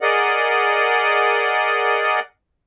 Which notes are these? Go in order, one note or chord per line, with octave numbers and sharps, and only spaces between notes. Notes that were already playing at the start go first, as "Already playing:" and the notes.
G#4 A#4 D5 D#5 F#5